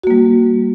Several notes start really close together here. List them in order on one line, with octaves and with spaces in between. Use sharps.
F#4 A#3 G3